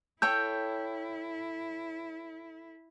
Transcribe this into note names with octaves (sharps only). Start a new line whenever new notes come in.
E4 A4 C#5 G5 G6